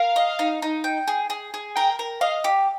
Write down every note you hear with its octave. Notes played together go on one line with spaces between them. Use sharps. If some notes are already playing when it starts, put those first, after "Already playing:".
Already playing: A#4 F5
D#5
D#4
D#4
G5
G#4
G#4
G#4
A#4 G5
A#4
D#5 F5
G4